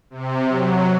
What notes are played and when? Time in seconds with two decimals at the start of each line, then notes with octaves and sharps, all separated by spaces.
0.10 C3
0.47 F#3